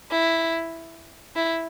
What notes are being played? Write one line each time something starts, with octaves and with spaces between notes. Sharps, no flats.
E4
E4